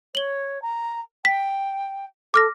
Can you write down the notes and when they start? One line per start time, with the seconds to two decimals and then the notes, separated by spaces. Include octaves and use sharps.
0.15 C#5 F#7 G7
0.62 A#5
1.25 G5 B6
2.34 A4 D6 F6 A#6